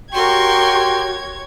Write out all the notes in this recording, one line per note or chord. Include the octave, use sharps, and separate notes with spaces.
F#4 G4 A#4 C#5 G5 C6 C#6 G#6